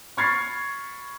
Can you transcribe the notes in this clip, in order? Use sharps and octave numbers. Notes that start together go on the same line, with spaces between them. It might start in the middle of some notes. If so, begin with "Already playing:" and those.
B5 C#6 F6 G#6 A6 C7